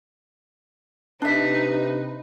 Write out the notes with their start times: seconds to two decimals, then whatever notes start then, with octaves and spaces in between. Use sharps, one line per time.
1.22 C3 D4 D#4 B4 E5